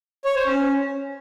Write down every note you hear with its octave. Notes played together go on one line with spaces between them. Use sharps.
C#5
C5
C#4